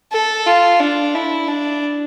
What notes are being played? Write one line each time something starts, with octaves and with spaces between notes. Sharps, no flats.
A4
F4
D4
E4
D4